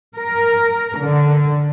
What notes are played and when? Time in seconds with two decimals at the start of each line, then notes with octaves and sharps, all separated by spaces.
0.17 A#4
1.00 D3